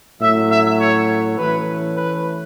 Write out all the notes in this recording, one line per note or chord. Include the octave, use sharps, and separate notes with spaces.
A2 F#3 C#4 E5
E5
C#5
E3 A3 C#4 B4
B4